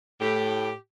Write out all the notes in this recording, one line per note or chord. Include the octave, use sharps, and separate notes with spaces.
A2 G4